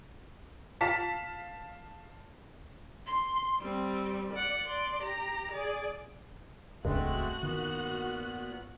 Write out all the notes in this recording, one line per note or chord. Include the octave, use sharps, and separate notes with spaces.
F4 F5 A5 B6
C6
G3 C4
D5 F#5
D5 C6
G4 A#5
G#4 D5
D#1 C#2 G2 G#3 A3 C4 F#4 F#6
A#2 D#3 B3